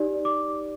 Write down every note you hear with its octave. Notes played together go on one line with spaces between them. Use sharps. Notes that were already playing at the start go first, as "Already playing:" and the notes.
Already playing: D#4 G4 D5
D6